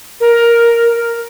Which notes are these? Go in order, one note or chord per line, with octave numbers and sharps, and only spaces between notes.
A#4